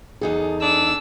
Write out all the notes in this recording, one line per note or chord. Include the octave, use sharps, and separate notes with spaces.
E2 D#4 G#4 A4
D4 E6